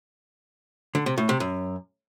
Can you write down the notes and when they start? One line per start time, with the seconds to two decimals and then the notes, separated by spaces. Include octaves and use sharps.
0.95 D3
1.06 C3
1.18 A2
1.29 C3
1.40 F#2